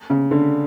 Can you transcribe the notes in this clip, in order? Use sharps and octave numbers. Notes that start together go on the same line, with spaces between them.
C#3
D3